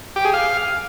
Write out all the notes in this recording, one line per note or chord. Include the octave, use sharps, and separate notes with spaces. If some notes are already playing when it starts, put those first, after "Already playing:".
G4
G#4
F5